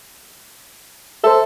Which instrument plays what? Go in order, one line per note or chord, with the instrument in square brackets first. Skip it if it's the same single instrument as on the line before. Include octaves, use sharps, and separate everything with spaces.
[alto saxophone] A4 [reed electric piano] C5 E5